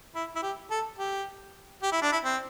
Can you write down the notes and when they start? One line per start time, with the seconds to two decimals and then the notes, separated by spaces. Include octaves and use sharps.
0.15 E4
0.36 E4
0.43 G4
0.71 A4
0.98 G4
1.83 G4
1.92 E4
2.02 D4
2.12 E4
2.24 C4